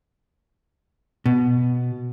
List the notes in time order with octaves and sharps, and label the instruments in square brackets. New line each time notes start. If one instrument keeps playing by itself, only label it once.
[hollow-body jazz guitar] B2